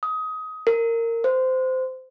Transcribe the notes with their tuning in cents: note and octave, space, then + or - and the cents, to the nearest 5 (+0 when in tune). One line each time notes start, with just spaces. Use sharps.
D#6 +20
A#4 -20
C5 -20